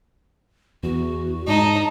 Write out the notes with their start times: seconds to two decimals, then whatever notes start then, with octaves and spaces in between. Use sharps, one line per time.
0.83 E2 F#4
1.48 G#2 D#4 A5